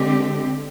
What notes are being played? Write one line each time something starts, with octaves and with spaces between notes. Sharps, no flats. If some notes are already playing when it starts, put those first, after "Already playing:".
Already playing: D3 G#3 C4 G4